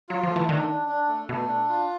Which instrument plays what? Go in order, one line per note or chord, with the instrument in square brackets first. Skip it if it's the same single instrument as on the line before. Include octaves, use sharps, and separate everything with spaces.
[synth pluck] F#3 [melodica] F4
[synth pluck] F3
[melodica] A3
[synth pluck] E3
[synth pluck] D#3 [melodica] D4
[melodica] D4
D4
A3
[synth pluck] B2 [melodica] A3
[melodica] D4
F4